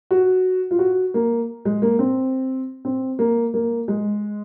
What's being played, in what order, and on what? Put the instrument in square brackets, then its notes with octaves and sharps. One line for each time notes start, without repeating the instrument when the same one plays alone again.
[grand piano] F#4
F4
F#4
A#3
G#3
A#3
C4
C4
A#3
A#3
G#3